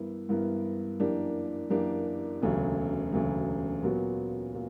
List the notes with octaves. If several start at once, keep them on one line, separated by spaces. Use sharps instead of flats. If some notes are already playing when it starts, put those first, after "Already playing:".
Already playing: G2 E3 B3 E4 A#4
G2 E3 B3 E4 A#4
F#2 E3 A#3 D4 G4
F#2 E3 A#3 D4 G4
E1 D2 C#3 F#3
E1 D2 C#3 F#3
A#2 F#3 B3 F#4
A#2